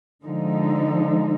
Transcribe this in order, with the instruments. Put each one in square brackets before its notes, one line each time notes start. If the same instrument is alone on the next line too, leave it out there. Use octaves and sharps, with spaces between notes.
[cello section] D3 F3 G#3 D#4